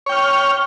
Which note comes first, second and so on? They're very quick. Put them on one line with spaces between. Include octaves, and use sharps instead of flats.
C#5 G5 F6